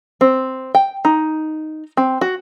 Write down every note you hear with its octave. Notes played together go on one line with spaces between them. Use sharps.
C4
G5
D#4
C4
F#4